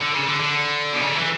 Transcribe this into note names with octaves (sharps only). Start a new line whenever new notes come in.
D3
C#3
D3
D3
B2
C#3
D3
E3